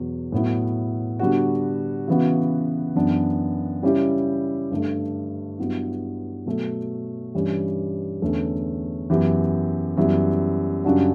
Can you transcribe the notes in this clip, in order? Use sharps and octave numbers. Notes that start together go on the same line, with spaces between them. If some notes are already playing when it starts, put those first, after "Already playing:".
Already playing: E2 B2 F#3
A2 F#3 B3 E4
D3 G3 B3 F#4
C#3 E3 B3 F#4
F#2 E3 B3 D4
C#3 G3 C#4 E4 G4
G2 D3 A3
G2 F#3 B3 E4
B2 F#3 A3
G2 E3 G3 C#4
E2 D3 A3 C#4
F#2 E3 B3 E4 G4
F#2 E3 G3 B3 E4
F#2 C#3 G3 D4 F#4